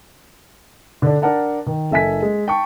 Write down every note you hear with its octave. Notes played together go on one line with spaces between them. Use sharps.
D3 D4
D4 A#4 F#5 A5
D#3
F#1 A4 E5 G#5 B6
G#3
G5 A5 C#6